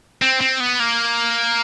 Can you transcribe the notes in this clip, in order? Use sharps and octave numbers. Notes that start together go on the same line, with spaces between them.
C4
C4
B3
A#3